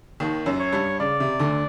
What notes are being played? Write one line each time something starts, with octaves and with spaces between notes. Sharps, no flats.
D#2 D#3
F#2 F#3
C#5
G2 G3
C#3 D5
C3
D2 D3